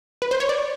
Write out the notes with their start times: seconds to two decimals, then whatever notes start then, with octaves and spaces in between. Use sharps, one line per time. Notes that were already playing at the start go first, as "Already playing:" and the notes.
0.22 B4
0.31 C5
0.40 C#5
0.49 D5